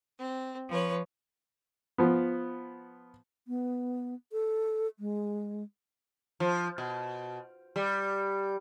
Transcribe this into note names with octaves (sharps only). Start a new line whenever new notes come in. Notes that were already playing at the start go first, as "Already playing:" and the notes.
C4
F3 B4 C#5
F3 B3
B3
A4
G#3
F3
B2
G3